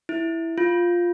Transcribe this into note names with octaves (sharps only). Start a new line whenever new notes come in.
E4
F4